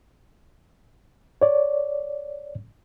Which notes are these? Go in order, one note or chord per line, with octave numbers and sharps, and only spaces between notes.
C#5 D5